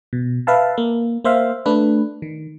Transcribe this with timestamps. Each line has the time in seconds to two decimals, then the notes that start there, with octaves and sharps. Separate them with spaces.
0.13 B2
0.47 B4 E5 F5 A5
0.78 A#3
1.24 A#3 C5 E5 F5
1.66 A3 D4 B4
2.22 D#3